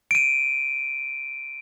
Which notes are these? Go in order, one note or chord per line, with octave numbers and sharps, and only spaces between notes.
D7 D#7